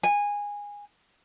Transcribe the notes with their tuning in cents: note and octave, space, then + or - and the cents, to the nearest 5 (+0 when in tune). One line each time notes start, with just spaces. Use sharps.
G#5 -15